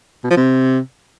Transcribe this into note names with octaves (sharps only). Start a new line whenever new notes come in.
B2
F3
C3